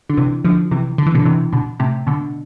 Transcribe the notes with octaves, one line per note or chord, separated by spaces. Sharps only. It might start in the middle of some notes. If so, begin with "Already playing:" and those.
D3
C3 E3
D3 F3
C3 E3
D3
E3
B2 D3
C3 E3
B2 D3
A2 C3
B2 D3